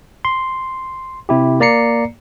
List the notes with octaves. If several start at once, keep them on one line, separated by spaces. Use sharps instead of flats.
C6
C3 E4 G4
A#3 D5 A#5 C7 C#7